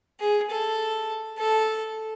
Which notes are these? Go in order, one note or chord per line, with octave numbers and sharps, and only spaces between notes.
G#4
A4
A4